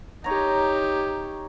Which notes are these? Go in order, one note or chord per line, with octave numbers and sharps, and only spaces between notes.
D#4 G4 C#5 A#5